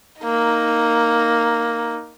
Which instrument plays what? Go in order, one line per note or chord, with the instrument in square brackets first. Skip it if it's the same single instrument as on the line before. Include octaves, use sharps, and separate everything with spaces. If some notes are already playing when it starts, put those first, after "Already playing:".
[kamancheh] A#3 D#4